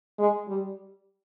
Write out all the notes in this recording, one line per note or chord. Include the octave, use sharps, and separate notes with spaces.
G#3
G3